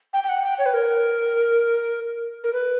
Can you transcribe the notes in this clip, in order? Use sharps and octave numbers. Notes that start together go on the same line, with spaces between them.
G5
G5
F#5
G5
C#5
B4
A#4
A#4
B4